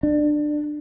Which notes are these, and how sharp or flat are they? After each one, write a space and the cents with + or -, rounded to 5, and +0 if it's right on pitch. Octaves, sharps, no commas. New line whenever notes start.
D4 +20